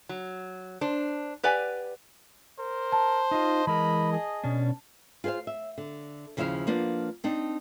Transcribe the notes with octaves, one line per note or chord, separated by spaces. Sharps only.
F#3
D4 C5
G4 B4 D5 F#5 G#5
A#4 C5
A5
D#4 F4 D#5
E3 G#3 A#4 D#5 B5
G#4
B2 C#4 D4
F4 G#4 B4 C5 F5
E5
D3
D#2 C#3 F3 E4 E5 F5
F3 A#3 B3 D4
C4 D4 D#4